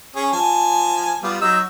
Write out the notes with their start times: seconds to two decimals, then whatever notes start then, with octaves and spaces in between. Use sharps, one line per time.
0.16 C#4 G#4
0.33 F3 G#5 A5
1.23 G3 B3 F4
1.41 F#3 D#4 E6